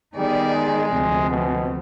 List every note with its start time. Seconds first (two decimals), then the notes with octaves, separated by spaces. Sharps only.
0.16 D#3 G3 B3 D#4 G#4 D5
0.54 G#3
0.92 D2 C3 F3 C4
1.30 B2